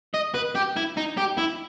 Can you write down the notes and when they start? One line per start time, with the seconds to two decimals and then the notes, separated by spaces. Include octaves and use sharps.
0.14 D#5
0.34 B4
0.55 G4
0.76 E4
0.97 D#4
1.17 G4
1.38 E4